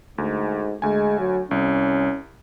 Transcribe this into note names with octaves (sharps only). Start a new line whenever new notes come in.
D2 G#2
D2 G#3 G#5
F#3
C2 C#4